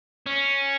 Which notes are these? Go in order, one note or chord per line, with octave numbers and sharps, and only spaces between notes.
C#4